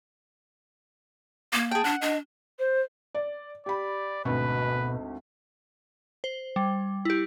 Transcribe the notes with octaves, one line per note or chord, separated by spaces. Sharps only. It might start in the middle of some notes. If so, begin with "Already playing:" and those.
A#3
G#4 G5 A5
D4 F#5
D4 D#5
C5
D5
G4 D5 B5
G#1 D2 B2 B4
C5
G3
E4 G4